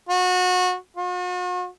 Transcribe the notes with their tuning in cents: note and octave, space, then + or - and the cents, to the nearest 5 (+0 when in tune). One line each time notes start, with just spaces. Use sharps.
F#4 -25
F#4 -45